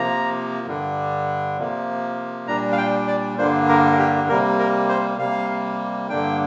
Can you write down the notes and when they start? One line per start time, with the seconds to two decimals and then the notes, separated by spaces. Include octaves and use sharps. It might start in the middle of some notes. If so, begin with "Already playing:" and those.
Already playing: C3 F3 A#3 A#5
0.67 G2 D3 G3 D4
1.57 C3 F3 A#3
2.47 A#2 G3 D4 A#5
2.72 F5
2.78 G5
3.07 D5
3.38 G2 D3 G3 A#3 D4 C5
3.69 A#4
3.92 A#4
3.98 G4
4.28 C3 G3 A#3 A#4
4.59 A#4
4.89 C5
5.19 C3 G3 A#3 F5
6.10 G2 D3 A#3 D4 G5